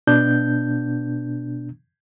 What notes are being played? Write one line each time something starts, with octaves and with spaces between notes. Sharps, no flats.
B2 B3 D4 G6